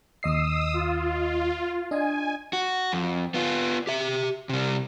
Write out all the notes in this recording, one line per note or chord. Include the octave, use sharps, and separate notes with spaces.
D#2 D#5 D#6 E6 C7
F4
D4 D#5 G#5
F#4
F2
B3 F4
G4 E5
C3 G3